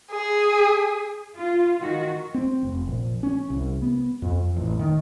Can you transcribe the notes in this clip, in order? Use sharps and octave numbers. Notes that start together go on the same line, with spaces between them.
G#4
F4
D#3 F#4
C4
F1
A#1
C#4
C2
B3
F2
A1
D#3